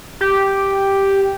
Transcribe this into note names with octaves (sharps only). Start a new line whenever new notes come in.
G4